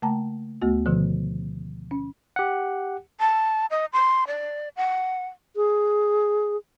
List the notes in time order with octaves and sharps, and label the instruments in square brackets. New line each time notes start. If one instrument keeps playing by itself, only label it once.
[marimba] C#3 A3 A#3 G5 A5 A#5
D2 A3 B3 F#4
B2 D3 D#3 F3
C#4
[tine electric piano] G4 F#5
[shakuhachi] A5
D#5
C6
D5
F#5
[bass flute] G#4